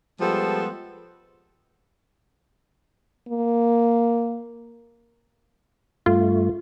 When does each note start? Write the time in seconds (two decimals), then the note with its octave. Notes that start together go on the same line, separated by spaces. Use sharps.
0.21 F3 G3 G#3 B3 A4 C5
3.28 A#3
6.06 G2 A3 F4